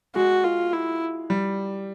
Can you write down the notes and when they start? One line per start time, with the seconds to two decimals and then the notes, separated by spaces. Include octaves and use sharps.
0.15 G#3 F#4
0.44 F4
0.73 E4
1.30 G3